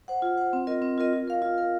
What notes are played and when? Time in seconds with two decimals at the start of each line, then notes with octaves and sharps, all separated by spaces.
0.08 C5 F#5
0.22 F4
0.37 C5 F#5
0.53 C4
0.67 F4 A#4 D#5
0.82 C4
0.98 F4 A#4 D#5
1.13 F4
1.28 A#4 F5
1.42 F4
1.58 A#4 F5